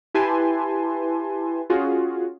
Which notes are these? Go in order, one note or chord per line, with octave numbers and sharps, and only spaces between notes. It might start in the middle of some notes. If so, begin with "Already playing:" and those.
E4 G4 B4 G#5 A5 C6
C#4 F4 F#4 G#4